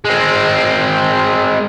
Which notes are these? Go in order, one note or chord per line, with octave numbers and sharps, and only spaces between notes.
G#3 C4